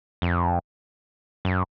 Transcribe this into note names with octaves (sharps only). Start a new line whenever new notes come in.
F2
F#2